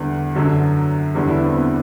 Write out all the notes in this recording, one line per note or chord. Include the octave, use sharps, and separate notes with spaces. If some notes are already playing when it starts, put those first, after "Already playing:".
Already playing: E2 D3 G3
F#2 D3 F#3
E2 D3 G3
E4
D4
C4
B3